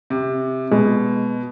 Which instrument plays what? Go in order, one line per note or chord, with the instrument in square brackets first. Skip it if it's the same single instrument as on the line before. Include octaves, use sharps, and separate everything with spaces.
[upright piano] C3
[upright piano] B2 [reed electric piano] G#3